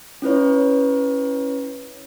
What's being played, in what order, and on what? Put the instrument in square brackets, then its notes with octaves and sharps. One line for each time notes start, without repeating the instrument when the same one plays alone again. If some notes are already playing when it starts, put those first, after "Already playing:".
[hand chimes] C#4 E4 B4 C#5